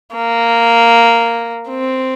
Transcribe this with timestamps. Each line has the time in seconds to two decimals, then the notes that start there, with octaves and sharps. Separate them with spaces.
0.15 A#3
1.69 C4